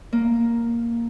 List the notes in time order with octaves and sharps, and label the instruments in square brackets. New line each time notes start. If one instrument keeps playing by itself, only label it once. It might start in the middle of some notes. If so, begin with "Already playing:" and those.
[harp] A#3